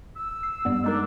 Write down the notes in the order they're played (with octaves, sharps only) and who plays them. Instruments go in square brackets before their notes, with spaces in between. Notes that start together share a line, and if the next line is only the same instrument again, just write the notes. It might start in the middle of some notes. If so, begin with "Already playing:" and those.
[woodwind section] E6
[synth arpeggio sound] C7
G2 G3 B3
[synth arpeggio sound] G#3 D#4 A#4 [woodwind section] D4